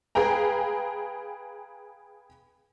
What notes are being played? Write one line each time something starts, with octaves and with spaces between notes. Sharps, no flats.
G#4 B4 F5 G5 A#5